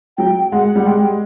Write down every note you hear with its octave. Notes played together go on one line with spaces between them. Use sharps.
F#3 G5
G#3 F#5
G3
G#3 G5